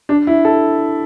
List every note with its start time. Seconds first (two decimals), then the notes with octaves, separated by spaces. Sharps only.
0.09 D4
0.27 E4
0.45 A4